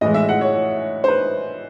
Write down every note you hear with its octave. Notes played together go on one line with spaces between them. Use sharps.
A2 E3 G#3 D#5
E5
F#5
C#5
C5
B4